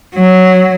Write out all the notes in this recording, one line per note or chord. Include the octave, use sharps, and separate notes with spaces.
F#3